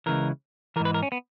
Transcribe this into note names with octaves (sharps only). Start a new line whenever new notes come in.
C#2 C#3 E3 A#4
G#2 E3 A#4
B4
A#4
C#4
B3